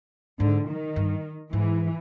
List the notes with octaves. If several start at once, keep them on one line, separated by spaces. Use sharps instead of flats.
G#2 D3
D#3
G2
G#2 E3